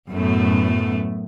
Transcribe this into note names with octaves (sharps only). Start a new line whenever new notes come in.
F#2 A2 A3 B3